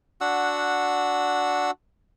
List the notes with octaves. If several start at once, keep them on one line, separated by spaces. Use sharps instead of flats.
D4 F#4 F#5 E6